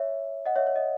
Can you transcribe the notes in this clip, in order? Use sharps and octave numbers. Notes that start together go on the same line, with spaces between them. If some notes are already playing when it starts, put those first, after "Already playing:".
Already playing: C#5 E5
D#5 F#5
C#5 E5
C#5
D#5